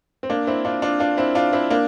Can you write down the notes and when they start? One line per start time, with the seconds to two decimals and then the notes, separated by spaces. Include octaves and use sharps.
0.23 C4
0.30 A#3 D4
0.47 C4 E4
0.65 D4 F4
0.82 D4 F4
1.00 D4 F4
1.17 C4 E4
1.35 D4 F4
1.53 C4 E4
1.70 A#3 D4